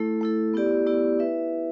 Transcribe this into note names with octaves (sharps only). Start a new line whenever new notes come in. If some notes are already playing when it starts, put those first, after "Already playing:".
Already playing: A3 E4 A4
A3 E4 A4
B3 E4 G4 D5
B3 E4 G4 D5
E4 B4 E5